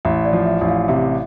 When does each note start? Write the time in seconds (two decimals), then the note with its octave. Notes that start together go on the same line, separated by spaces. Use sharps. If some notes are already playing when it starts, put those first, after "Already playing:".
0.05 A1 E5
0.25 D5
0.33 F3
0.46 E5
0.61 A1
0.68 F5
0.88 C3 E5